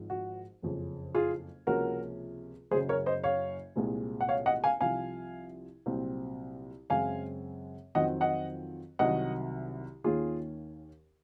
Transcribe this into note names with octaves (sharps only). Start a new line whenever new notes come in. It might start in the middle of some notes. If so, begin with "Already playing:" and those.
Already playing: G#1 G#2 F3
F#4
F#1 F2 C#3
F4 G#4
C#2 C3 F3 A#3 C#4 F#4 A#4
F#1 F#2 C#3 G#4 C5
A#4 C#5
C5 D#5
C#5 F5
C2 A#2 G#3 C4
F#5
C#5 F5
D#5 F#5
F5 G#5
C2 C3 F3 F5 G#5
C2 A#2 F#3 C4
F#2 C#3 G#3 C4 F5 G#5
F2 D#3 F#3 C4 D#5 F#5
D#5 F#5
C2 C3 D#3 F#3 D#5 F#5
D#2 D#3 A#3 C#4 F4 G#4